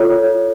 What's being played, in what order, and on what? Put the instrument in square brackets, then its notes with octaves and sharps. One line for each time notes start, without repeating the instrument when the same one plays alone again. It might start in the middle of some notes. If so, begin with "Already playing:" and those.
Already playing: [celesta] F4 A4 C#5